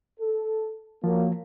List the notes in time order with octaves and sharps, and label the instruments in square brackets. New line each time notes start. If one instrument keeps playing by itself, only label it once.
[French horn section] A4
[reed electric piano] F3 [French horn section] F#3 A#3